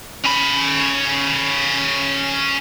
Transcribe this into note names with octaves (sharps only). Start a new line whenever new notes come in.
C#4 B5